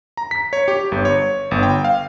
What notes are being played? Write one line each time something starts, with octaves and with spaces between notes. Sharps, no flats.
A#5
B6
C#5
G4
G1
C#5
G1
G5
F5